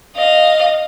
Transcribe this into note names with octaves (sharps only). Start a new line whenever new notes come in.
D#5 F5